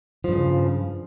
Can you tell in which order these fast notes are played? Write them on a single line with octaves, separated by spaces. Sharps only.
F3 G2 C#3